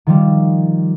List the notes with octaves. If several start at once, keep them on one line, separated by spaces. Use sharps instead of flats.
D#3 F3 G3